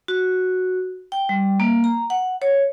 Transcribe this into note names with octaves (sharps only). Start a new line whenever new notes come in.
F#4
G5
G3
A#3
A#5
F#5
C#5